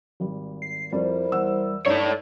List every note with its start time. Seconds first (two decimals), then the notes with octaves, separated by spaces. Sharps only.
0.20 G#1 G3
0.62 C7
0.93 F2 G3 E4 A#4 C5
1.32 E2 F#5 E6
1.86 G2 D#4 A4 C#5 D5 A#5